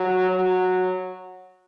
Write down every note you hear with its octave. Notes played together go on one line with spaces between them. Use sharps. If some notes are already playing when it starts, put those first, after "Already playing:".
Already playing: F#3
F#3